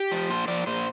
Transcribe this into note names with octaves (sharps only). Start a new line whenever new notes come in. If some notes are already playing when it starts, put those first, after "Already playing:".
Already playing: G4
F3
A#2 C5
F3 D5
A#2 C5